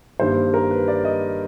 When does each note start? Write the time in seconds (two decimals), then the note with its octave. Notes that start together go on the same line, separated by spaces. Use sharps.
0.20 G2 D#3 G3 A#3 C5
0.54 A#4
0.71 B4
0.88 D5
1.05 D#5